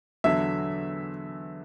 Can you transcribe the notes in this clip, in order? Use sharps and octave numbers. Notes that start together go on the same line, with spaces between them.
E2 D3 F#3 E5